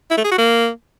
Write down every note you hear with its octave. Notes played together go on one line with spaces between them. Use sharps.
E4
A3
G#4
F#4
A#3